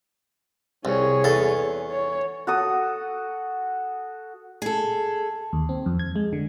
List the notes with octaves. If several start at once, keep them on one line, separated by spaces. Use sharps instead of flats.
C2 G#4 C#5
E2 A4
C#5
F#4 A4 D#6
G#4 A4
D#2
C4
F2
G#6
G#3
D3